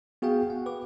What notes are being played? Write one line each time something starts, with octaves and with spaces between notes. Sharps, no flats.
B3 F#4 G#4 F5 G5
F#5
B4 D6